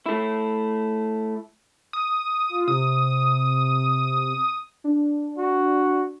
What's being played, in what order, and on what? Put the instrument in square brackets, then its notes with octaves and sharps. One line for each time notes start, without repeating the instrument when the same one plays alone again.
[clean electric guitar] A3 E4
[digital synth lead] D#6
[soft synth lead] F4
[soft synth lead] C3 [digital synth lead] D#6
[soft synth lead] D4
[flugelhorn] F#4